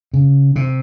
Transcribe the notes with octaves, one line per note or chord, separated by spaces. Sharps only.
C#3
C3